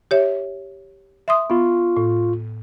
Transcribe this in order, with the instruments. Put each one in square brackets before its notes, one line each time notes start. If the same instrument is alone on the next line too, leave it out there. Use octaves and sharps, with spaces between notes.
[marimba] G4 C#5 E5
E5 C6 D#6
[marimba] B3 [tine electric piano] F4 C#6
[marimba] A2